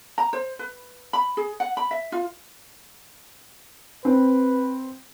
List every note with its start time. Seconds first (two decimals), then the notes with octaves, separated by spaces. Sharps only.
0.18 A#5
0.33 C5
0.59 B4
1.13 B5
1.37 G#4
1.60 F#5
1.77 B5
1.91 E5
2.12 F4
4.05 C4 B4